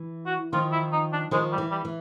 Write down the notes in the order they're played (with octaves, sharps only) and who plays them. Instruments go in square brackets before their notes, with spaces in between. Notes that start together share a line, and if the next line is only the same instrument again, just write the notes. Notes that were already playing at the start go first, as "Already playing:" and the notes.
Already playing: [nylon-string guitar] E3
[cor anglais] F#4
[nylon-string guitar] D#3 F3 [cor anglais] F4
[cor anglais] E4
D#4
D4
[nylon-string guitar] D#3 F3 [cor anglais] G#3
[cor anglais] G3
[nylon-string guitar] E3
[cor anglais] G3
[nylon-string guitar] E3